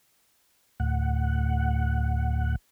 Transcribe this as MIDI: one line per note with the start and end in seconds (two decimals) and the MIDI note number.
0.80 2.55 38
0.80 2.55 45
0.80 2.55 78